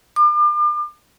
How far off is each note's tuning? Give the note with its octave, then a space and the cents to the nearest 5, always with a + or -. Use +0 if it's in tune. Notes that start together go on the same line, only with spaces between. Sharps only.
D6 +40